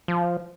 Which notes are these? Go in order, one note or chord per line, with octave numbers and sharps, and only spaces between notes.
F3